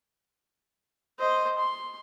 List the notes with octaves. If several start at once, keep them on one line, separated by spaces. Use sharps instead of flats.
C5 D#5
C6